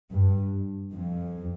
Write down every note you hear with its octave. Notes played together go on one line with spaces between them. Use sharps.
G2
F2